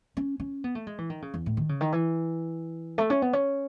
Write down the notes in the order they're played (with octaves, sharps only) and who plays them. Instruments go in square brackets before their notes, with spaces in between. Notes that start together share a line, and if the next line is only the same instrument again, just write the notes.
[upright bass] C#4
C#4
B3
A3
G#3
E3
D#3
C#3
E2
A2
D#3
C#3
D#3
E3
A3
C#4
B3
C#4